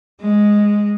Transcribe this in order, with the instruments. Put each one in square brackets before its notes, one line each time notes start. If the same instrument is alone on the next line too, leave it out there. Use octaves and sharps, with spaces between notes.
[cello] G#3